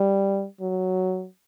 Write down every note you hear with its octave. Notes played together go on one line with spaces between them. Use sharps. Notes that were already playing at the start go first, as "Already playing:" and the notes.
Already playing: G3
F#3